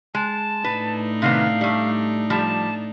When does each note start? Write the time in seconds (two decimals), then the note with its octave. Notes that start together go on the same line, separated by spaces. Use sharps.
0.15 G#3 A5
0.64 A2 D4 D#4 B4
1.22 C3 D#3 B3 F5
1.61 G3 A3
2.30 F3 G3 A5